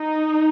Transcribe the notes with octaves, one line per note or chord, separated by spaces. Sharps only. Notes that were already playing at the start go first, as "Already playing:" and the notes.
Already playing: D#4